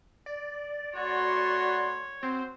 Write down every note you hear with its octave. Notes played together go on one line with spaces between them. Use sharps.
D5
A3 F#4 C#5 B5 C6
C4 F#4 C5